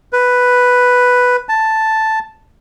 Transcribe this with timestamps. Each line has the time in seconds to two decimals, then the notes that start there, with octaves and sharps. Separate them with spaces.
0.13 B4
1.49 A5